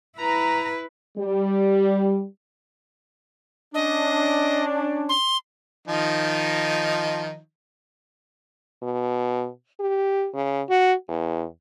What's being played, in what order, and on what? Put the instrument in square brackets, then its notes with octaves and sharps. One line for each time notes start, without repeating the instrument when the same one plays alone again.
[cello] E4 B4 [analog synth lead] A#5
[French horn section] G3
[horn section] C#4 D4 [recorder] D#5
[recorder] C6
[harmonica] D#3 F3 D#4
[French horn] B2
G4
C#3
F#4
E2